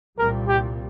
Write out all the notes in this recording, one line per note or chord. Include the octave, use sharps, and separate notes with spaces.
C2 A#2 G3 C4 A#4
G4